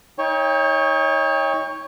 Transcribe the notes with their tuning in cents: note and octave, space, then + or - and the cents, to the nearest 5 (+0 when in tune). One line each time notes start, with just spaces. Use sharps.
D#4 +30 C#5 +0 G5 +40